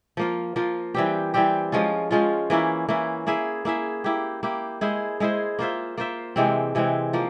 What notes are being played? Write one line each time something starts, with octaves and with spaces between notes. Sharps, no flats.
F3 A#3 F4
F3 A#3 F4
E3 G3 C4 G4
E3 G3 C4 G4
F3 G#3 C#4 F4
F3 G#3 C#4 F4
E3 A#3 C#4 E4
E3 A#3 C#4 E4
A#3 E4 G#4 E5
A#3 E4 G#4 E5
A#3 E4 G4
A#3 E4 G4
G#3 E4 G#4 C5
G#3 E4 G#4 C5
A#3 F4 C5 E5
A#3 F4 C5 E5
C3 E3 G#3 C4
C3 E3 G#3 C4
F3 A#3